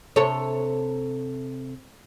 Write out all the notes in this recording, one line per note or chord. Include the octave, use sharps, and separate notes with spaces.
C3 A4 C#5